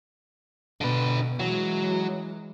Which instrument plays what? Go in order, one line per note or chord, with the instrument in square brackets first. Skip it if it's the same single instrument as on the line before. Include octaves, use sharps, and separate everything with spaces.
[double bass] B2 [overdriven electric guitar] D3 B4
[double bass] E3 G#3 [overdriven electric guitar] F#3